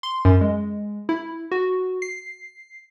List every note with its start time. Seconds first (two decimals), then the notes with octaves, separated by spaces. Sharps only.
0.03 C6
0.25 F#2
0.41 G#3
1.09 E4
1.51 F#4
2.02 C7